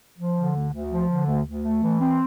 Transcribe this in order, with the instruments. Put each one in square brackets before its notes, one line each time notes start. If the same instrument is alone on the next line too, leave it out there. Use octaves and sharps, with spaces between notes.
[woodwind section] F3
D3
D2
D2
F3
D3
D2
D2
A3
E3
C4